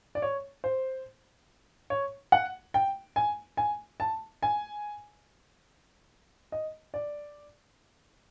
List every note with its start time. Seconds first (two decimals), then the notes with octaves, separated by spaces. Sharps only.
0.15 D5
0.22 C#5
0.64 C5
1.90 C#5
2.32 F#5
2.74 G5
3.16 G#5
3.57 G#5
4.00 A5
4.43 G#5
6.52 D#5
6.94 D5